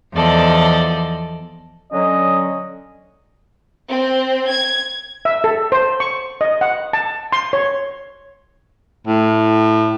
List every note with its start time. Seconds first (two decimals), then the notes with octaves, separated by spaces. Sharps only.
0.13 E2 F3 A4 D5 D#5
1.92 D3 F#3 C#4 D#5
3.89 C4
4.50 G#6
5.25 E5
5.44 A4
5.72 C5
6.00 C#6
6.41 D#5
6.61 F#5
6.93 A5
7.32 C6
7.53 C#5
9.07 A2